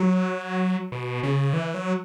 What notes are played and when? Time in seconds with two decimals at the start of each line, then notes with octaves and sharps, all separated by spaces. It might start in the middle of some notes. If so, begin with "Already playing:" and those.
Already playing: F#3
0.92 B2
1.23 C#3
1.53 E3
1.74 F#3